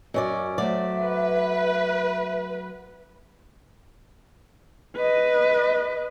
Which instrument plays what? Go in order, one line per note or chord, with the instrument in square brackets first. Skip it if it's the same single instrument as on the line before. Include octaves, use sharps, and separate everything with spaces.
[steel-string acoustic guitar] F#2 C#4 D5 [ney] F#4 [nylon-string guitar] D#5
[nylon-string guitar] F#3 A3 C5 [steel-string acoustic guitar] D5 [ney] E5
[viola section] B4
[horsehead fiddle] B4 D#5